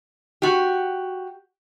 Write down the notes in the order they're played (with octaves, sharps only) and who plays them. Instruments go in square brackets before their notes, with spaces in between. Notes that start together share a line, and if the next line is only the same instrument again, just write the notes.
[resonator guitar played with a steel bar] F#4 G4